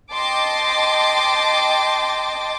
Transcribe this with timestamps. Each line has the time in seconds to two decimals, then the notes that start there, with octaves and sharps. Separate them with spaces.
0.13 D#5 G5 A5 C6 D6